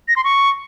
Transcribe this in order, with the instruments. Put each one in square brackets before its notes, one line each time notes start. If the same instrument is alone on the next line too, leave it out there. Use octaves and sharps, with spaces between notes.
[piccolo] A#6
C6
C#6